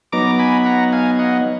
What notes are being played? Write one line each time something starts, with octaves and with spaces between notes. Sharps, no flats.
F#3 B3 D#4 A#5 D6
G#5 B5
F#5 A#5
F5 G#5
D#5 F#5